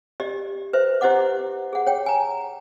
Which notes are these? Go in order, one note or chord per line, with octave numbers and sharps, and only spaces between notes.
G4 D5 D#5
B4 C5 E5
E4 G4 C5 D#5 F#5 D6
G#4 F#5
C#5 G5
G#5 A#5